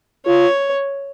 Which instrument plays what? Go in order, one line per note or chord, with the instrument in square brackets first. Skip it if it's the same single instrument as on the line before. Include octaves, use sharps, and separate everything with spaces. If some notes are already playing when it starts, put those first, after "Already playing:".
[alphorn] F4 [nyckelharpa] C#5